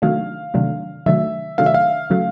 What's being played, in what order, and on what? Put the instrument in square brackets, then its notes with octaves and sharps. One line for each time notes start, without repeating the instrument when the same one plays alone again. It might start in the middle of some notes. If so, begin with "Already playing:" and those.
[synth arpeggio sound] C3 D#3 F#3 A3 D4 [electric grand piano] F5
[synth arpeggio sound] C3 D#3 F#3 A3 D4
[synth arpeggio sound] C3 D#3 F#3 A3 D4 [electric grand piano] E5
[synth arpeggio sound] C3 D#3 F#3 A3 D4 [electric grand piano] F5
[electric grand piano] E5
F5
[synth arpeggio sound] C#3 F#3 A3